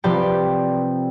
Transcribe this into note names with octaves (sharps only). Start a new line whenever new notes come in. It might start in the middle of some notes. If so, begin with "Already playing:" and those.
C3 F3 G4 B4 D5 G5